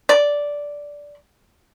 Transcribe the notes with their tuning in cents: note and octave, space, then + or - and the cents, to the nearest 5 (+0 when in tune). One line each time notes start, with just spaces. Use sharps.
D5 -10